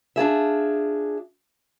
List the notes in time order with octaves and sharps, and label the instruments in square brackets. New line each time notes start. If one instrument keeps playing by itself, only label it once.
[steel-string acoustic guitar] D4 F4 G#4 E5